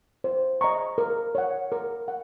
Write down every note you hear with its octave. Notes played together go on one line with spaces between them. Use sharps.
C5
D#5 A#5 C#6
A#4
C#5 F#5
A#4
F#5